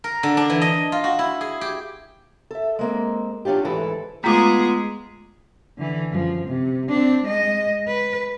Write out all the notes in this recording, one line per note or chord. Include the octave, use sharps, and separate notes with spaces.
A#4
D3
D4
E3
D#5
F4
F#4
E4
G#4
G4
A4 E5
G#3 A#3 C4
F#3 C#4 D4 F4 G4
D2 G#2 E3 A4 B4
G#3 A3 B3 F4 G#4 A#5 D6 B6
D3 E3
F#2 F3
C3
C4 D4
G#3 D#5
B4